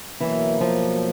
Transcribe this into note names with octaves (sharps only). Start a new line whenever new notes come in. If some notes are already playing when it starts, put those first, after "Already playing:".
B2 E3 F#3 A#3
F3